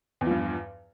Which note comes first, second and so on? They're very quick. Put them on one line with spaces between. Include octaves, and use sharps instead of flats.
E2 F3 G2